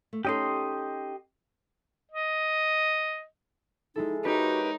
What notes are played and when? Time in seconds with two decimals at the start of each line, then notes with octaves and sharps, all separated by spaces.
0.13 A3
0.25 C#4 D#4 G4 A4 D#5 C6
2.12 D#5
3.96 G#3 D#4 E4 A4
4.25 D#4 F#4 G4 A#4 B4 C#5